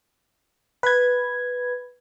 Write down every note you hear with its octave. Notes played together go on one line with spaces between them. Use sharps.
B4 G#6